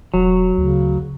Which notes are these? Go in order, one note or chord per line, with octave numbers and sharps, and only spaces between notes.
E1 F#3
D2 C#3